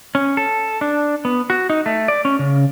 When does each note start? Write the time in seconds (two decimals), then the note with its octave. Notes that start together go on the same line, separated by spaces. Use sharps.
0.15 C#4
0.37 A4
0.81 D4
1.25 B3
1.50 F#4
1.70 D#4
1.86 A3
2.08 D5
2.25 C#4
2.39 C#3